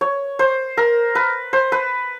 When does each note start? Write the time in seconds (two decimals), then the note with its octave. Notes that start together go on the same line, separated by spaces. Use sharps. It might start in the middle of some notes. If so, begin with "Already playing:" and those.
0.01 C#5
0.39 C5
0.77 A#4
1.15 B4
1.53 C5
1.72 B4